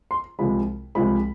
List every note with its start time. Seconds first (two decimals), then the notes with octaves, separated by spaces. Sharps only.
0.11 C6
0.39 C2 C3 F3 G#3 B5
0.95 C2 C3 F3 G#3 B5